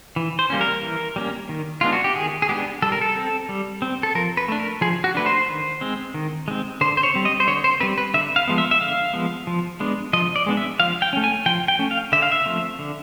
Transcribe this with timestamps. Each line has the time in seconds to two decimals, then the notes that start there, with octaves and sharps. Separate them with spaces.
0.16 E3
0.39 C5
0.50 G3 A#3 C#4
0.61 A#4
0.83 E3
1.16 G3 A#3 C#4
1.49 D#3
1.81 G#3 B3 D4 F4
1.93 F#4
2.04 G4
2.16 D#3 G#4
2.42 G#4
2.49 G#3 B3 D4 G4
2.82 G3 A4
2.92 A#4
3.01 A4
3.16 C4
3.49 G3
3.82 C4
4.03 A4
4.15 F3 A#4
4.37 B4
4.48 A3 D4
4.59 A#4
4.81 F3 G#4
5.04 F#4
5.15 A3 D4 B4
5.26 C5
5.48 D#3
5.81 G#3 C4
6.14 D#3
6.48 G#3 C4
6.81 D3 C5
6.97 C5
7.03 C#5
7.14 G3 C4
7.25 D#5
7.40 C5
7.47 D3 C#5
7.64 C5
7.80 G3 C4 B4
7.98 B4
8.14 D3 E5
8.36 F5
8.48 F3 G#3 B3
8.58 E5
8.71 E5
8.80 D3 F5
9.14 F3 G#3 B3
9.47 F3
9.80 G#3 B3 D4
10.13 F3 D#5
10.36 D5
10.47 G#3 B3 D4
10.57 E5
10.80 F3 F5
11.02 G5
11.13 A3 C#4
11.24 G#5
11.46 F3 G5
11.68 G5
11.79 A3 C#4
11.91 F5
12.12 D3 E5
12.22 F5
12.32 E5
12.46 F3 A3 C4
12.79 D3